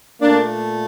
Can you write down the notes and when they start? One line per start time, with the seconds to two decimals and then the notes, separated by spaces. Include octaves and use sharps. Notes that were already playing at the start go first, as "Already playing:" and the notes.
0.21 A#2 A3 A#3 D4